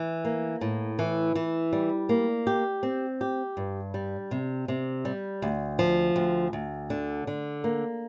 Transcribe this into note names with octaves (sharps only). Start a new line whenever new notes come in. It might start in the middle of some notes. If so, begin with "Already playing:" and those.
Already playing: E3
A#3
A2
E3
E3
G3
A#3
G4
C4
G4
G2
G3
C3
C3
G3
D2
F3
D2
D2
D3
D3
A#3